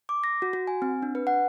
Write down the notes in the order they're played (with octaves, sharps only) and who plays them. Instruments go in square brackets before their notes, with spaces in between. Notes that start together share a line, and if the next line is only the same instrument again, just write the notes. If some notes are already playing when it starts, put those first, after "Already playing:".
[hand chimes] D6
A#6
F#4
F#4
G#5
C4
D4
B4
F#5